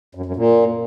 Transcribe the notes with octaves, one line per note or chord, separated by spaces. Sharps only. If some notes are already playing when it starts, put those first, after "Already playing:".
F#2
F#2
A#2